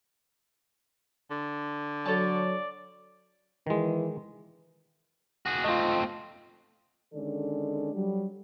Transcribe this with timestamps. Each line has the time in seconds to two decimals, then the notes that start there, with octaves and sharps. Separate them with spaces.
1.31 D3
2.06 F#3 A4 C#5 D5 A5
3.67 D#3 E3 G#3
5.46 F#4 G#4
5.64 A3 C4 F4 D#5
7.14 D3 D#3 G#3 C#4 A4 D5
7.94 F#3 G3